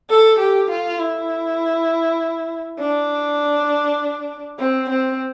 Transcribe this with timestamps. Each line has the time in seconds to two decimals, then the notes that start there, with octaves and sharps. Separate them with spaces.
0.10 A4
0.40 G4
0.70 F4
1.00 E4
2.80 D4
4.59 C4
4.90 C4